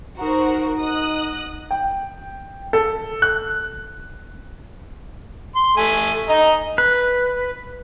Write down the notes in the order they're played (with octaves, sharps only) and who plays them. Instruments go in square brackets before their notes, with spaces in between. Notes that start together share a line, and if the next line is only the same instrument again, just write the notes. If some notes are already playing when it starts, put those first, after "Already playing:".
[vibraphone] D#4 F#5 A#5 [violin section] F#4 A#4 C5
[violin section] D#5 D#6 F#6
[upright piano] G5
A4
F#6
[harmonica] C6
A3 G#5
D#5 A#5
[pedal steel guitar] B4